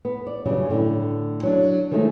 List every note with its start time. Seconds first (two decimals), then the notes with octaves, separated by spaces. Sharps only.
0.05 B3
0.27 D5
0.45 G2 C#3 F#3 D4 G4
0.70 A2 D3 G5
1.43 F#3 D4
1.91 D#3 F3 G#3 A3 D#4